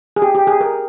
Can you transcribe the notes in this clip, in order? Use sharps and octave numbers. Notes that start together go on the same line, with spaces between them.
G#4
G4
G4
G#4
A#4